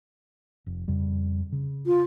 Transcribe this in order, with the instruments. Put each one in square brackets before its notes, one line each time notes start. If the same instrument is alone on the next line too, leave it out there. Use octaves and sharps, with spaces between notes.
[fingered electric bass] F1
F2 C#3 G3
C#3
[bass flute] F4